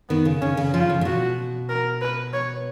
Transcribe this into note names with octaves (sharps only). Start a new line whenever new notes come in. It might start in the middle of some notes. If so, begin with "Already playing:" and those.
D#3 B3
C#3
C#3 C#4
C#3
F3 F4
C#3
A#2
B2 F#4
A#4
B4
C#5